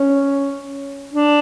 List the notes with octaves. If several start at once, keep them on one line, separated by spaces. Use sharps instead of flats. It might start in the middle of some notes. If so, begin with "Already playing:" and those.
Already playing: C#4
D4